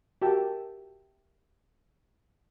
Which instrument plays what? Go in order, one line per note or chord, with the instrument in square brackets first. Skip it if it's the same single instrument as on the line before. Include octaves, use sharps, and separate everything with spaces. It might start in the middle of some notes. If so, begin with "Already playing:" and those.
[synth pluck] F#4 G4 A#4 E5 G5 A5